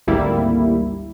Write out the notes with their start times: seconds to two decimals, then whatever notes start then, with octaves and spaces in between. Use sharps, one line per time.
0.07 G#1 D2 G3 A#3 E4